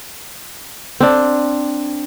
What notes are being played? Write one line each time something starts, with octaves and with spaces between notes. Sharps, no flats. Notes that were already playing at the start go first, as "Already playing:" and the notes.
C4 D4